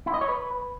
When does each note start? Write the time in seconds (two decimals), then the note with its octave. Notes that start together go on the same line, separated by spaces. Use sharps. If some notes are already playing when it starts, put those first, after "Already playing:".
0.06 E4
0.14 D#5
0.21 C#5
0.29 B4